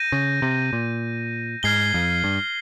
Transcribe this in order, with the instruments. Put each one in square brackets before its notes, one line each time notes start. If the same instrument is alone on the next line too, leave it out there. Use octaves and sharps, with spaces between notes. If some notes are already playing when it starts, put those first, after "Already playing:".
Already playing: [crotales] G6 A#6 D#7
[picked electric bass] C#3
C3
A#2
[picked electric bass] G#2 [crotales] F6 G#6 C7 G7
[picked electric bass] F2
G2